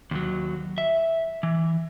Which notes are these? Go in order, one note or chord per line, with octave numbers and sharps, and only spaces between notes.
D#2 F#3
E5
E3